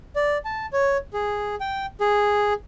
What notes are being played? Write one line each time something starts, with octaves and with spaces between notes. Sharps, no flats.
D5
A5
C#5
G#4
G5
G#4